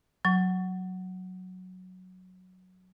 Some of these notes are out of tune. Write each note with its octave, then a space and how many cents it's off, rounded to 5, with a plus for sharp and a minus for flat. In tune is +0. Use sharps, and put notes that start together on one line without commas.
F#3 -5 C#6 +20